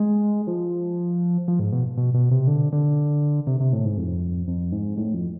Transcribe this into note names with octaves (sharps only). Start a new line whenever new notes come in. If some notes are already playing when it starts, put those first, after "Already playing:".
Already playing: G#3
F3
F3
G#2
B2
B2
B2
C3
D3
D3
C3
C3
A2
G#2
F2
F2
G#2
A2
F2